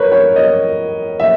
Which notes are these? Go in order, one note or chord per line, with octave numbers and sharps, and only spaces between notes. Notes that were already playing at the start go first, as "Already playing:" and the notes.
Already playing: A#4 B4 C#5
C#5
D#5
E5